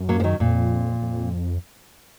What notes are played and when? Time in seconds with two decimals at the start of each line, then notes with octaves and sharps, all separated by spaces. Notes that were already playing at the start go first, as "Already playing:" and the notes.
Already playing: F#2
0.09 F#3 A#3
0.20 F3
0.24 D#3 F#3
0.40 F2 A#2
1.02 F2